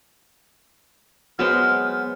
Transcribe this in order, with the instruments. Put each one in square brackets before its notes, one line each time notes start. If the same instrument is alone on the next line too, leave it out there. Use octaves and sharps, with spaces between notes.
[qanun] F#3 G#3 C5 [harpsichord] B3 [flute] F6